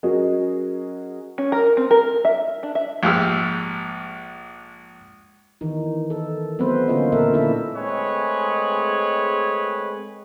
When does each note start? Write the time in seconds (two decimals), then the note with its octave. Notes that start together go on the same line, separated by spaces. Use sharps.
0.03 F#3 C#4 F#4 G#4 A#4 D#5
1.38 C#4
1.52 A#4
1.77 C4
1.91 A#4
2.25 E5
2.63 D4
2.75 E5
3.03 A#1 G#2 G4 E6 F6
5.61 D#3 E3 D#4
6.10 A4
6.59 F#3 A3 B3 C4 B4 C5
6.88 D3 A#3 C#4 F4 D#5
7.12 A#2 A#3 A4 A#4 E5
7.34 D4 E4 E5
7.75 G#3 A3 C4 G#4 B4 C#5